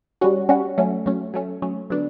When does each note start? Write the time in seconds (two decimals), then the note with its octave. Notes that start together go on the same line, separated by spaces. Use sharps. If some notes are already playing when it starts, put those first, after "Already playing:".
0.21 G3 C#4 F#4
0.49 G3 C#4 F#4
0.78 F#3 A3 C#4
1.06 F#3 A3 C#4
1.34 F#3 A3 C#4
1.62 F#3 A3 C#4
1.90 D3 F#3 B3 D4